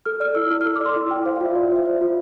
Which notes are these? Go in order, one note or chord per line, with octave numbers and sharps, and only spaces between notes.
A4 F6
D5 F6
E4 E6
E4 F6
F6
A4 E6
D6
D5
C6
E4
E4 G5
C5 F5
F5
F4 E5
F4 D5
C5 E5
C5
F4